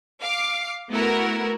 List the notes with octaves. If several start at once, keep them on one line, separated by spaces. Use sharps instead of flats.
F5 D6
A3 B3 E4 F#4 A#4